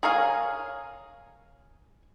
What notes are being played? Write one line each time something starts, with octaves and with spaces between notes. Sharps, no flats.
G#4 A#4 C#5 F5 G#5